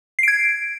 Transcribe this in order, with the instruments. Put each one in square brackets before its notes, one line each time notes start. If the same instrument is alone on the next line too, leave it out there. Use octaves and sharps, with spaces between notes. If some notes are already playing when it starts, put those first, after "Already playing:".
[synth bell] C7
D7
G#6